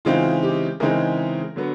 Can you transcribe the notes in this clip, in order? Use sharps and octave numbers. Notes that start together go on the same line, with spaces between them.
C#3 E3 G#3 C4 D#4 F4
G4
C#3 E3 G#3 C4 D#4 A#4
D3 F#3 B3